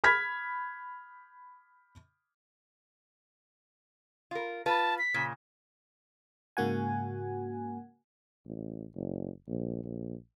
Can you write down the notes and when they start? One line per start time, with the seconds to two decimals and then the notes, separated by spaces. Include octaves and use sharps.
0.04 B5 F6 G#6 B6
4.31 F4 A#4
4.66 F4 B4 A5
4.98 B6
5.14 A#2 C#3
6.57 G#2 C#3 A#3 F#4 F#5 G#5
8.45 A1
8.95 F#1
9.48 A#1
9.84 A#1